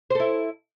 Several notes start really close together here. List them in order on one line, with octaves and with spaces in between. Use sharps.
C5 A4 E4